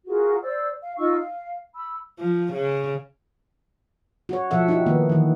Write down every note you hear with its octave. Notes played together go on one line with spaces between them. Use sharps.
F4 F#4 G#4 A#4
C5 D5 E6
F5
D#4 F4 C#6 E6
F5
B5 E6
F3
C#3
F#4 C#5
B2 F3 A4 E5 F#5
D#4 E4 F#4 G4
D#3 A#3 B3
D#3 E3